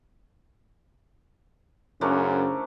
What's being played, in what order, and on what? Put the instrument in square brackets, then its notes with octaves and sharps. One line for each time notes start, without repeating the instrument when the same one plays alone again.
[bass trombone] F#2 [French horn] C#3 [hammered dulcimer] A3 C#4 D4 [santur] E4 A#4 C5